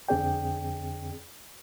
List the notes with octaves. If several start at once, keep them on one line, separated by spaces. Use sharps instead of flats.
F2 D3 C4 G#4 D5 G5